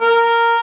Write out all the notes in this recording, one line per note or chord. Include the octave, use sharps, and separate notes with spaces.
A#4